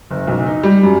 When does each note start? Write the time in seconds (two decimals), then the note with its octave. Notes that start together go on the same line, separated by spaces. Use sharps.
0.11 F#1
0.27 B1
0.46 D#4
0.63 G3
0.83 F#2